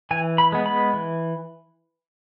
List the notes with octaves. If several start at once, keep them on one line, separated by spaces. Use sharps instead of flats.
E3 G#5
B5
G#3 B3
B5
E3